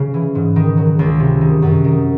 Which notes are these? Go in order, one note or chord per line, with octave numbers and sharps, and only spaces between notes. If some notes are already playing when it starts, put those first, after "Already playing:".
Already playing: C#3
E3
G#2
D#3
F#3
C#2
C3
D#3
F#2
D#3